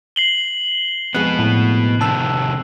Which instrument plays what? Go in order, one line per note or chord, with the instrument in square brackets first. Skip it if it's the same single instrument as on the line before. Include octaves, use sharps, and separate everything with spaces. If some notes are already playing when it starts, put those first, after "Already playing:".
[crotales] C7 F#7 G7
[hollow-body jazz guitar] F2 G#3 [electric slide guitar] B2 B3 [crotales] F#6
[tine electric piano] A2
[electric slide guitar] C3 D#3 [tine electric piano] A5 E6